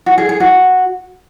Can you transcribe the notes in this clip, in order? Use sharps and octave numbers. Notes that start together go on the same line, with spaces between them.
F#4
G#4
G#4
F#4